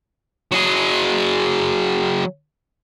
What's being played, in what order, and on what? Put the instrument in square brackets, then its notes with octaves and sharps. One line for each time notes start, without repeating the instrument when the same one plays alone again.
[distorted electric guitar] F#3 G#4